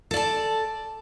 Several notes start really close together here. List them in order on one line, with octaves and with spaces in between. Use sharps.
A4 D5 A5